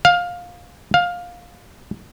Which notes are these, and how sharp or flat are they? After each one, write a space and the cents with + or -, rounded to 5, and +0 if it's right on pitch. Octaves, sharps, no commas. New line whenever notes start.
F5 +15
F5 +15